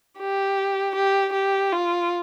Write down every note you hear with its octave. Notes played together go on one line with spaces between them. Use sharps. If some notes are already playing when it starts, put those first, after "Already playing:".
G4
G4
G4
F4